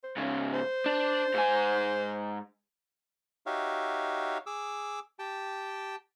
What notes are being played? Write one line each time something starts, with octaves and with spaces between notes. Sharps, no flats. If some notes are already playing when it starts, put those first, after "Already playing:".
C5
G#2 C#3 C#4
C5
D4
G#2 G#5
D#4 F#4 G4 C#5 E5 F5
G#4 D6 E6
G4 G5 A5